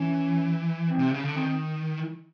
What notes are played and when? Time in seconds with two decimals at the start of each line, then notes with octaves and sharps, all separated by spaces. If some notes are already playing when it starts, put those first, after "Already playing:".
Already playing: E3 C#4
0.90 C4
0.98 C3
1.11 C#3
1.23 D3
1.35 D#3 C4
1.47 C4